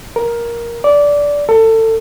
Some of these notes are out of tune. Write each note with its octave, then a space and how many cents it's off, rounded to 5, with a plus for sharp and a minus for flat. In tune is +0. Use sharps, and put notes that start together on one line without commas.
A#4 +10
D5 -15
A4 +30